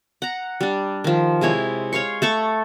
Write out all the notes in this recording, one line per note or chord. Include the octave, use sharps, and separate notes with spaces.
F#5 A#5
G3 D4
D#3 F3
C3 G#3 E4 C#5
C#5 F5 C6 C#6
A3 A4 C#6